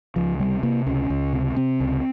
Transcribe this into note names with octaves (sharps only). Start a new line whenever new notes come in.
C#2 F3
C3 G3
C3 A#3
C#2 C#4
C#2
C3
C3 C4
C#2